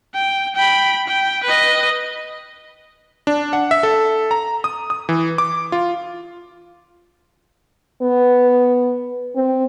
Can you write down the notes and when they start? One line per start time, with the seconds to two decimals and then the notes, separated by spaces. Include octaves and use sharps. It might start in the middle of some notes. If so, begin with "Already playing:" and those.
0.14 G5
0.56 G5 B5
1.08 G5
1.44 B4 D#5
3.27 D4
3.53 F#5
3.71 E5
3.83 A4
4.31 A#5
4.64 D#6
4.90 D#6
5.09 E3
5.38 D6
5.72 F4
8.02 B3
9.36 C4